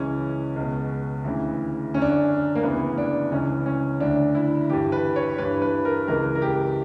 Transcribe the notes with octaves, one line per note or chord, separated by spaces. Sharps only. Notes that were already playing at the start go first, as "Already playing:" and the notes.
Already playing: C#2 C#3 E3 C#4
C#2 B2
D2 C#3 E3
F#2 D3 C#4 D4
C#4
A#3
D2 C#3 E3 B3
D4
C#2 C#3 E3 C#4
C#4
D2 D3 D4
E4
G2 E3 G4
B4
C#5
G2 E3 B4
B4
A#4
C#2 C#3 E3 A#4
A#4
G4